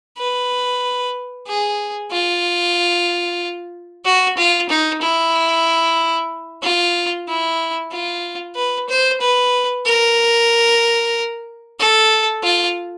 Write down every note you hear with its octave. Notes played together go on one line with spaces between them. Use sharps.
B4
G#4
F4
F#4
F4
D#4
E4
F4
E4
F4
B4
C5
B4
A#4
A4
F4